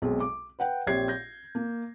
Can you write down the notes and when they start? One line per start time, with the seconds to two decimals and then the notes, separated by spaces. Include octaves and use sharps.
0.02 B1 B2 G#3 C4 G#4
0.20 D6
0.59 B4 F#5 G5
0.87 A#1 C4 G4 C#5 G#6 C7
1.08 G6 A#6
1.55 A#3